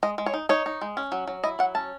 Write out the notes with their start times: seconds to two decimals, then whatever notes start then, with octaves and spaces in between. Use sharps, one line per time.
0.03 G#3 D#5
0.18 G#3
0.26 C#5
0.34 D#4
0.49 D#4 C#5
0.66 D#4
0.81 G#3
0.97 C#4
1.12 F#3
1.27 F#3
1.44 E4 D#5
1.59 F#3 F#5
1.75 C#4 A5